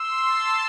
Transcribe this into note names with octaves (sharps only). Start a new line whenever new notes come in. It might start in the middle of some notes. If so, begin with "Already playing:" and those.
Already playing: C6 E6
A5